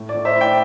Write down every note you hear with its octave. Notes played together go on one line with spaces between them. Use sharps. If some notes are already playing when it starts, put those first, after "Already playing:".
Already playing: A2
D5
A2
C5 E5
E4
D5 G5